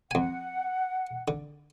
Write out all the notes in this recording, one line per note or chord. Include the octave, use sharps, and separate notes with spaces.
F2 F#5 G#5
D3